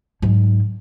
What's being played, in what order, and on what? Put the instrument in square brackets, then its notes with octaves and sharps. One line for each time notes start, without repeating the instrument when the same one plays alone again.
[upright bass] G#2 F#3